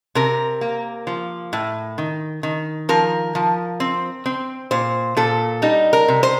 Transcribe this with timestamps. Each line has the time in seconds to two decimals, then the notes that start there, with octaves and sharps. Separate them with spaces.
0.15 C3 A#4
0.61 A#3
1.07 F3
1.53 A2
1.98 D#3
2.43 D#3
2.89 F3 A#4
3.35 F3
3.80 C4
4.26 C4
4.71 A#2 C5
5.17 A#2 A4
5.62 G3 D#4
5.93 A#4
6.08 C3
6.23 C5